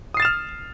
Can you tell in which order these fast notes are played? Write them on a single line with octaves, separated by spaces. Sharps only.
D#6 C7 A6 E7 F6